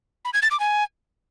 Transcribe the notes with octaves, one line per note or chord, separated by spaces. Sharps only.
B5
G#6
A6
D6
G#5